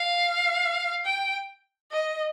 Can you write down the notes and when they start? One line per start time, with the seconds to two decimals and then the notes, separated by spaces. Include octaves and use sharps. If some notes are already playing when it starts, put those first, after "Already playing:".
Already playing: F5
1.05 G5
1.92 D#5